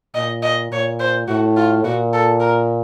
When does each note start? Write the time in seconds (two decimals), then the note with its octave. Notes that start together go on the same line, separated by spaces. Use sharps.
0.15 A#2 D#5
0.43 D#5
0.71 A#2 C#5
1.00 C5
1.28 A2 F#4
1.56 F4
1.84 A#2 F#4
2.13 A4
2.40 A#4